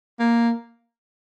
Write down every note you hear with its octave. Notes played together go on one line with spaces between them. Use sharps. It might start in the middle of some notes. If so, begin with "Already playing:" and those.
A#3